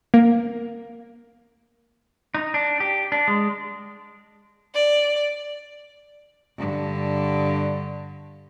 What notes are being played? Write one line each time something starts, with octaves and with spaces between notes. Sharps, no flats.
A#3
D#4
D4
G4
D4
G#3
D5
G2 D3